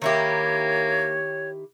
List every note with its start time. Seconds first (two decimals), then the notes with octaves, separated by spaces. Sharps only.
0.02 D#3 A#3 E4 G4 C#5